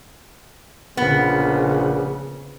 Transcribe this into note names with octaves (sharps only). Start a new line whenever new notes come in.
A#1 C#3 B3